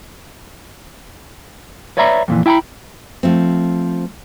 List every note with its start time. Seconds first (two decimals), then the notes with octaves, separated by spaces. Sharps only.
1.97 B4 C#5 D5 E5 A#5 B5
2.28 F2 A#2 E3
2.46 E4 G5 G#5 A#5 B5
3.23 F3 A3 C4